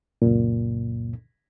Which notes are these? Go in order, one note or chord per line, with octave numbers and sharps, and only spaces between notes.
C#2 F#2 A#2